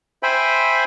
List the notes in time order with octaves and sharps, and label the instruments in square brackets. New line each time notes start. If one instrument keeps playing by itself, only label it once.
[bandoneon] C5 E5 G5 G#5 B5